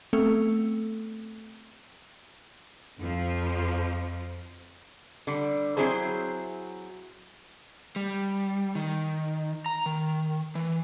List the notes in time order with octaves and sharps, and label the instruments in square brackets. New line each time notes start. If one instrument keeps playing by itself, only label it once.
[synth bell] A3 B3 C4 A4
[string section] F2 F3
[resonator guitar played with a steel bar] D3 G3
F#3 C4 E4 G#4 C5
[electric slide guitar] G3
D#3
A#5
D#3
E3